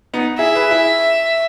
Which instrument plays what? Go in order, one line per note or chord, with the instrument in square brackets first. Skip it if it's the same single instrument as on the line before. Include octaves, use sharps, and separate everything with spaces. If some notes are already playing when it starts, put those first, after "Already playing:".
[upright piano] B3 D#4
[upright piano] E4 G#4 [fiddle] E5
[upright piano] G#4 B4
E4 G#4